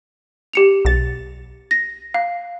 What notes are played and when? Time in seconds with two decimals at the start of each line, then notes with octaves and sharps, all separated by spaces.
0.53 G4 C#7 F7
0.85 B1 A6
1.71 A#6
2.14 F5